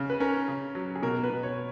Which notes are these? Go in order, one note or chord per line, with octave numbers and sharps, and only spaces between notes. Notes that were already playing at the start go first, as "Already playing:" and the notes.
Already playing: C#3
B4
C#4 A#4
C#3
F#3
G#4
B2 A#4
B4
B2
C#5